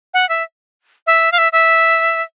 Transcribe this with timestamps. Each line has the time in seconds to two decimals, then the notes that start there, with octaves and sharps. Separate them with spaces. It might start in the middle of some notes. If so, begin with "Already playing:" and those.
0.14 F#5
0.29 E5
1.07 E5
1.32 F5
1.38 E5
1.52 E5